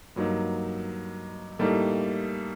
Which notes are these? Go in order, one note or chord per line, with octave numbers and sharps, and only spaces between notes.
G2 F#3 A#3 D#4
A2 G3 A#3 D#4 A4